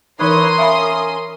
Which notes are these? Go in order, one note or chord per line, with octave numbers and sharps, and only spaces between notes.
E3 D#4 E4 A#4 B4 C#5 C6 D#6
C#4 E5 F5 B5